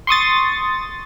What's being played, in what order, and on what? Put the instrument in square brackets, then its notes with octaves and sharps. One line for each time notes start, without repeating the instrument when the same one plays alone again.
[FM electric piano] C6 C#6 D#6 A6